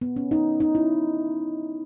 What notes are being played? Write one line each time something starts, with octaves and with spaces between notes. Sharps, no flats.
B3
C#4
D#4
D#4
E4